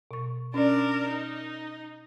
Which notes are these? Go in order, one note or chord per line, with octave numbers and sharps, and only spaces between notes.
B2 C#6
C#4 D4 A#4 D5
D#4